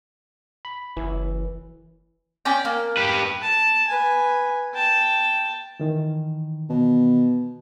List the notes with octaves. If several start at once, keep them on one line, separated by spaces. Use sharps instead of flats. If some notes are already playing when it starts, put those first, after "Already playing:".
B5
F#1 E3
C#4 D5 G5
A#3
G4 B4
A5
B4 G#5
G5 A5
D#3 E3
B2